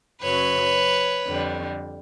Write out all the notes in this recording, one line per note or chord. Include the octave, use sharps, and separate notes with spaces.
F#2 C#3 F#3 B4 C#5
F2 D3 G3